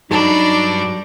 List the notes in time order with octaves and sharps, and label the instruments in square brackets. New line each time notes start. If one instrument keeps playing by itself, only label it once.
[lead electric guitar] G2 B5 [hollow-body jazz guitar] F#3 A4 [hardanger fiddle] D4 [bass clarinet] D#4